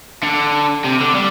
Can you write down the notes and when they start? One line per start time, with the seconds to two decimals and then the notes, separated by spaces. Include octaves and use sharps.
0.23 D3
0.85 C3
1.01 D3
1.15 G3